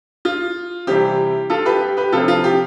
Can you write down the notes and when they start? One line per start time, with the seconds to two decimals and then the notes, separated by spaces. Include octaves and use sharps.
0.25 F4
0.87 C3 E3 G3 C4 G4
1.50 F4 A4
1.65 G4 B4
1.81 G4
1.97 G4 B4
2.12 C3 F3 C4 F4 A4
2.28 F4
2.44 G4